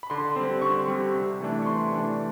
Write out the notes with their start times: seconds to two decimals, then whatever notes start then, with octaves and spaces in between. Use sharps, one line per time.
0.03 B5
0.10 D3 C6
0.36 G3 C4
0.62 D3 C#6
0.88 G3 C4
1.14 C3
1.40 E3 A3 D4
1.62 C#6
1.66 C3 C6
1.92 E3 A3 D4